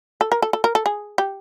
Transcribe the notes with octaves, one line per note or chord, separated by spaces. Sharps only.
A4
A#4
A4
A4
A#4
A4
G#4
G4